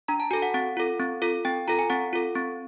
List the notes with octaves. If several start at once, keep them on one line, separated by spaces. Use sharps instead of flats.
D4 A#5
A5
F#4 A4 G#5
F#5
C4 F#5
F4 A4
C4
F4 A4
C4 G5
F4 A4 A#5
G#5
C4 F#5
F4 A4
C4